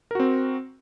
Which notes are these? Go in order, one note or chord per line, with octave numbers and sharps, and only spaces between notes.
C4 F#4 A#4